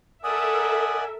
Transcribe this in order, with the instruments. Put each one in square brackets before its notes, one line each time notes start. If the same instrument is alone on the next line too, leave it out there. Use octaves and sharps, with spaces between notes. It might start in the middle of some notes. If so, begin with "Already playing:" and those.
[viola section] A4 A#4 E5 [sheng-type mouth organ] D5 F#5 G#5 [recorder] D#6